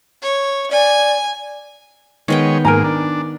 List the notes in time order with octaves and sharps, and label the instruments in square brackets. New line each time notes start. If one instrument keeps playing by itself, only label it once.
[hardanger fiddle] C#5
[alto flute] D5 [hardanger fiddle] G#5
[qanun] D#3 B3 G5 [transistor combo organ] G#3 C#5
[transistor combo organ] G#2 A#3 [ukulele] A#4 G#5 A#5
[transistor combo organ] D4